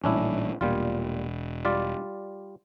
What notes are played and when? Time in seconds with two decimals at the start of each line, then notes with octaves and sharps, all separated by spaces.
0.04 A1 A#2 G3 C#4 D4 E4
0.61 E1 A#2 G3 F4
1.65 G3 F4 D5